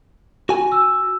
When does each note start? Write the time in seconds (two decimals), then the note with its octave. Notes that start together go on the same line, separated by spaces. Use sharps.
0.49 F#4 G#5
0.72 E6